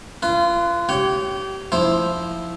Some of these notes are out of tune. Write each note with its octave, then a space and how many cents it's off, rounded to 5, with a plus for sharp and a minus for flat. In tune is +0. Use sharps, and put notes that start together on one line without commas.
F4 -25 B4 +0
G4 -30 C#5 +0 G5 -20
F3 +0 E4 +0 C5 +0